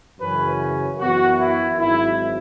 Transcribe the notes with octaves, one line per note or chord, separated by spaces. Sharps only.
F#2 C#3 E3 C#4 B4
F#2 E3 B3 F#4
E4
G#1 G#2 F#3 E4